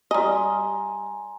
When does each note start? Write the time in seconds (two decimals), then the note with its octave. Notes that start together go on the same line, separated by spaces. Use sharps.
0.11 G3 D#5 G#5 A#5 C6